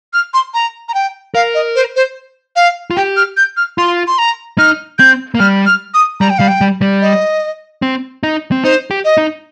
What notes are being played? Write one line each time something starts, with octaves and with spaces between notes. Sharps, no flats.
F6
C6
A#5
A#5
G5
A#4 F5
D#5
C5
C5
F5
F4
G4 G5
F6
G6
F6
F4 C6
C6
A#5
D#4 F6
C4 G6
A#3
G3 F6
F6
D#6
G3 A#5
G5
G3 F5
G5
G3
G3
D#5
C4
D#4
C4
D#4 C5
G4
D#5
D#4